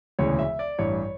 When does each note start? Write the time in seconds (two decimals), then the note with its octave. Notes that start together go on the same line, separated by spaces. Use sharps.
0.19 E1 D2 C#3 E3 C#5
0.39 E5
0.59 D5
0.79 A1 G2 E3 C#5